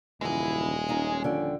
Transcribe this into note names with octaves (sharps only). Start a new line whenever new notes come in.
D#1 F#2 C#3 E3 G#3 E4 G#4
C#4 D#4 F4 D#5
D3 F3 G5